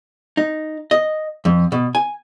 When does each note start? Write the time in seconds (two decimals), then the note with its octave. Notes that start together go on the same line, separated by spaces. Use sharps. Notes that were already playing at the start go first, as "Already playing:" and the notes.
0.37 D#4
0.91 D#5
1.45 F2
1.72 B2
1.95 G#5